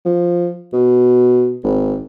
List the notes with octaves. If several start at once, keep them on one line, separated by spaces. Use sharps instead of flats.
F3
B2
G#1